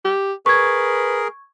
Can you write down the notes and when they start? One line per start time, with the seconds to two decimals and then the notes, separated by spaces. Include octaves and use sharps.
0.05 G4
0.46 G#4 A#4 B4 C#6 G#6